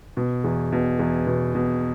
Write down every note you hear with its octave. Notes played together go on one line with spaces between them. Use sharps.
B2
E2
B2
E2
B2
B2